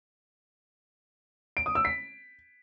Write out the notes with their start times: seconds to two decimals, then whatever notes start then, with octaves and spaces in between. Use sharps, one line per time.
1.57 D7
1.66 D#6
1.75 E6
1.85 B6